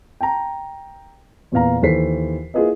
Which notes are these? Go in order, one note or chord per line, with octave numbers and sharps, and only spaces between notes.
G5 A5 A#5
E2 A#2 B3 F5 A#5
D#2 E3 A4 C5 B6 C7
A#3 E4 F4 G#4 B4 D#5